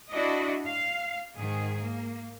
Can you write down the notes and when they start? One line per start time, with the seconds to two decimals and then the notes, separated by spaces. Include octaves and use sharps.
0.10 D4 E4 F#4 D5 D#5
0.66 F5
1.37 G#2 D#3 G#4
1.81 A#3